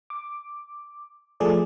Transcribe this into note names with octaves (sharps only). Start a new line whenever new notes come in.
D6
F3 A3 G#4 A4 D5